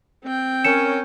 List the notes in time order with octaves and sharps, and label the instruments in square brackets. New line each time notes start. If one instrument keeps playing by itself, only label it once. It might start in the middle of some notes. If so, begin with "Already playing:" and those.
[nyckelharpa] C4 G5
[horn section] C#4 A#4 C#5 [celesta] C#7 E7